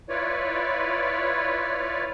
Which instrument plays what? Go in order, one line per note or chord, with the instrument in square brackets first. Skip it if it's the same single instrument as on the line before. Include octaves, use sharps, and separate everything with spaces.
[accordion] E4 F4 B4 C#5 D5